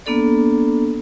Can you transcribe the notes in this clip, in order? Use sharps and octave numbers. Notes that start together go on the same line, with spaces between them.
A#3 B3 D4 A4 D5